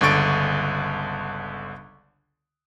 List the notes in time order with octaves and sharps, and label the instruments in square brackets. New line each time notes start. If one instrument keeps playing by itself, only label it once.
[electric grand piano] G1 C#2 D3 C#6 A6 D7